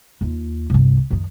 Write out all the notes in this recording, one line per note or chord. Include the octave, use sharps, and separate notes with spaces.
D#2 F4
G1 C2
F#2 D#3